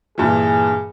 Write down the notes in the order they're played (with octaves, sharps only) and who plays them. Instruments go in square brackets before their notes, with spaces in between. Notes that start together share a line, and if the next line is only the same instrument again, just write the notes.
[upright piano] G2 A#2 E3 [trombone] G#4